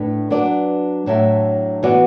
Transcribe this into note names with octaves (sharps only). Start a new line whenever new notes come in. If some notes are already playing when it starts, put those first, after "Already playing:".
Already playing: A2 A3 D4 B4
F#3 D4 B4 D5
A2 F#3 D4 A4 E5
E3 B3 F#4 B4 D5